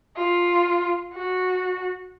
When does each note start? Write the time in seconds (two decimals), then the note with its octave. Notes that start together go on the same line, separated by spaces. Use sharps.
0.17 F4
1.13 F#4